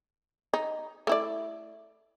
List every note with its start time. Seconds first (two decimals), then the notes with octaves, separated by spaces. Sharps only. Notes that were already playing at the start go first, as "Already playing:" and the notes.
0.54 D#4
1.07 A3 E4 D5